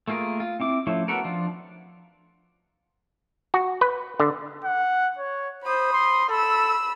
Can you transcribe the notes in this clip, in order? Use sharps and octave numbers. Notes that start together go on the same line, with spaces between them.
A3 A#3 F4 G#4 A#4
F4
C4 E4 D6
F3 A3 C#4 E4
B3 F#4 A4 A#4
F3 D4 F4
F#4
B4
D3
F#5
C#5
C5 B5 D#6
C6
A4 B5 E6